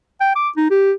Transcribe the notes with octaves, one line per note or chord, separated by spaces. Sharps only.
G5
D6
D#4
G4